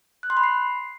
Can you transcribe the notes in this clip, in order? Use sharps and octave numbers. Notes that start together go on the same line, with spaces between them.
F#6
C6
B5
C7